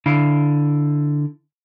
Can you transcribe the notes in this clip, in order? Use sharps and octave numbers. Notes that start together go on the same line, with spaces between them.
D3 E4 F5